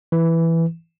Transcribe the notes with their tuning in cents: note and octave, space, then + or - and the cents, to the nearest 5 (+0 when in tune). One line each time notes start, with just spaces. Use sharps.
E3 +5